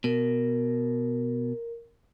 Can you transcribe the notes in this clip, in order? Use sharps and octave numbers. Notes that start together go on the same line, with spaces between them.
B2 A#4